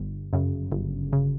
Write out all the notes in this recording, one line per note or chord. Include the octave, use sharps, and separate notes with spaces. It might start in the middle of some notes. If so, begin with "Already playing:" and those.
Already playing: G1
F#2 C#3
G1
C#3